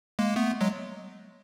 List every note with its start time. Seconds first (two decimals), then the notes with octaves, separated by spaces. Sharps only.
0.19 G#3 A#3
0.36 A3 B3
0.61 F#3 G#3